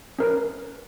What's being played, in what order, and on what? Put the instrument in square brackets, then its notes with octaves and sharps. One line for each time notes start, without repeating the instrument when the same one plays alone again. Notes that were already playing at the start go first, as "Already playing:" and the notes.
[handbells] C#4 A#4 B4